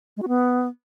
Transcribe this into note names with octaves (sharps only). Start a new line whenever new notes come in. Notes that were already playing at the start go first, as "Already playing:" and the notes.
G#3
F#4
B3